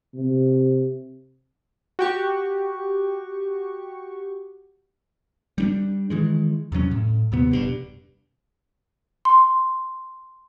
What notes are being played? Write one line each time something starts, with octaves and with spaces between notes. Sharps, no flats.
C3
F#4 G4 C#6
G3 C#4 D4
D#3 E3 G#3
E2 C3 F#3 C#4
A2
D#2 C3 B3
F1 G2 B2
C6